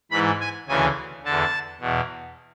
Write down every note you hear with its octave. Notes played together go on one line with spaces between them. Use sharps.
G#2 E3 B5
G#5
D2 C#3 E3 G#5
E2 D3 A5
E2 B2